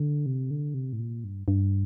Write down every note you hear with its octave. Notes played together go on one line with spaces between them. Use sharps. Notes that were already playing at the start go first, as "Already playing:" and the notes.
Already playing: D3
C3
D3
C3
A2
A#2
G2
G2